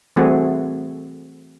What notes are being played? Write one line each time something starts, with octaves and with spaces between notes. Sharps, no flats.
E3 G3 A3 C4 F#4 G#4